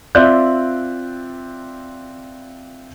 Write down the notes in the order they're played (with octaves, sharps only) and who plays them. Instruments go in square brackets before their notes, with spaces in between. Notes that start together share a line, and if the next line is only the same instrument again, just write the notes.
[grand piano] C4 F4 D5 E5 F#6 G6